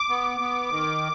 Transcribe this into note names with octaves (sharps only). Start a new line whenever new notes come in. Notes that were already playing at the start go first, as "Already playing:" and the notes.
Already playing: D6
B3
B3
D#3